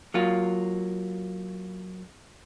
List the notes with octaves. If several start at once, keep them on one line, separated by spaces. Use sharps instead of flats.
F#3 A#3 F4